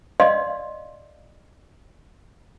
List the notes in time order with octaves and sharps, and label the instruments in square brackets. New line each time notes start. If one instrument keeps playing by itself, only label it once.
[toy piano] D5 D#5 F5 C6